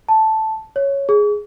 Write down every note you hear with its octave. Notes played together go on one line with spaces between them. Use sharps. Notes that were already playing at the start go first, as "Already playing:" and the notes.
A5
C#5
G#4